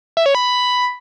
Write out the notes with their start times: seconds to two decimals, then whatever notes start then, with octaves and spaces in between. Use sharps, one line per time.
0.17 E5
0.26 C#5
0.35 B5